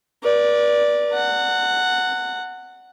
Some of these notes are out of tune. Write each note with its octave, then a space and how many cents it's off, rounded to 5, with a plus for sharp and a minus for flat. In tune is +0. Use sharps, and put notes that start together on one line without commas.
B4 -45 D5 +0
F#5 +0 A#5 -45